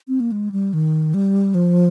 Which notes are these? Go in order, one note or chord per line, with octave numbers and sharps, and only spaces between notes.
C4
A#3
G#3
G3
D#3
G3
F3